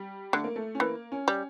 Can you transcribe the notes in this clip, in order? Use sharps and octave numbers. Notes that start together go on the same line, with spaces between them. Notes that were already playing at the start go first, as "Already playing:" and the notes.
Already playing: G3
D3 A3
A#3
A3
C#4
E3 A#3
C#4
G3